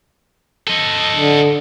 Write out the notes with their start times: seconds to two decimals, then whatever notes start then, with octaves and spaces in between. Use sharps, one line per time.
0.67 A4 D#5
1.16 D3